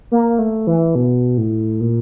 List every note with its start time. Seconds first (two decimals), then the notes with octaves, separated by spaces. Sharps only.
0.12 A#3
0.39 A3
0.67 E3
0.95 B2
1.38 A2
1.81 A#2